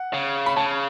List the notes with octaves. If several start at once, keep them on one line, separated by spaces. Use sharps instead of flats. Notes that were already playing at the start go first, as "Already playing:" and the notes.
Already playing: F#5
C#3
B5
C#3 A5